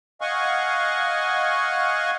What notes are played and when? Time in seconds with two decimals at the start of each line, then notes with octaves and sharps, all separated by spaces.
0.21 D#5 F5 F#5 G#5 C#6